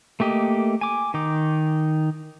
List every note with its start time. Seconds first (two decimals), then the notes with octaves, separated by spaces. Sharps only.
0.20 A3 A#3 G4 D#5
0.81 G#5 D6
1.14 D#3 D#4 D6